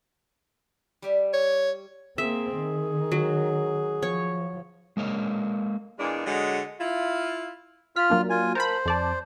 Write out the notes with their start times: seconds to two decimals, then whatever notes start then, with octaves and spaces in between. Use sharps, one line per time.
1.02 G3 G4 E5
1.33 C#5
2.18 A#3 C4 G#4 E5
2.57 D#3
3.12 F#3
4.03 F3 C#5
4.97 G#3 A#3 C#5 D#5
5.99 E2 A#2 G#3 D4 G#4
6.26 D3 F#3 G#3
6.80 E4 F4
7.96 F4 F6 B6
8.10 F#3 A#3 D4
8.30 F4 G#5
8.55 A#4 C5 A5 B5
8.86 F2 D5 A5